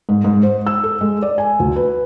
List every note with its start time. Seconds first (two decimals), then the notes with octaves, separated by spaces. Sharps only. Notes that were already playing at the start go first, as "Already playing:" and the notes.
0.09 G#2
0.24 G#2
0.43 C5
0.67 E6
0.83 A4
1.01 G#3
1.22 D5
1.38 G#5
1.60 D2
1.76 B4